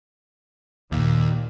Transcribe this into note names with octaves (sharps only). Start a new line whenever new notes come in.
D#2 A#2